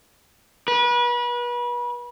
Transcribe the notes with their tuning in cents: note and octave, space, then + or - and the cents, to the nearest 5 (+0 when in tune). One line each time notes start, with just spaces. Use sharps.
B4 -35